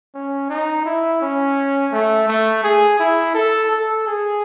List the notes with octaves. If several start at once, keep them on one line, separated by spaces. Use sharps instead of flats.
C#4
D#4
E4
C#4
A3
A3
G#4
E4
A4
A4
G#4